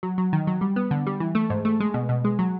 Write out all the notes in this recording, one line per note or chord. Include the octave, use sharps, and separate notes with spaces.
F#3
F#3
D#3
F#3
G3
B3
D3
G3
E3
A3
G#2
A3
G#3
B2
B2
G#3
F#3